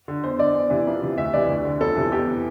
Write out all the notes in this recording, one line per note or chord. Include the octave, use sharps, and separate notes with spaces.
D3
E2 C5
D3 D5
E2
C3 E3
F2
C3 E3
D2 E5
C3 E3 D5
D2
D3
F2 A4
C3 E3
E2 G4
E3